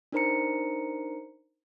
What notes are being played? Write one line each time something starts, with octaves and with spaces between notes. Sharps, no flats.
D4 D#4 A#4 C5 A#5 C#7